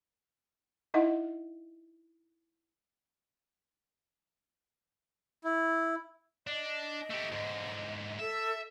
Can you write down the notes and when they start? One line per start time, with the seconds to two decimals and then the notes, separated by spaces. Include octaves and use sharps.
0.94 D#4 E4 D#5 E5 F#5
5.44 E4
6.47 D4 D#5
7.10 A3 G4
7.32 G#2 D3
8.19 A4 E5